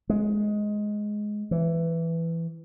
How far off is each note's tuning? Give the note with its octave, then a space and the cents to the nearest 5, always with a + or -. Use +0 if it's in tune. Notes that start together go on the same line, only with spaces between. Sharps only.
G#3 +10
E3 +10